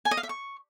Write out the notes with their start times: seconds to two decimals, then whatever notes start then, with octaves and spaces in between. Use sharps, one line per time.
0.05 G#5
0.11 D#5
0.17 F5
0.23 E5
0.29 C#6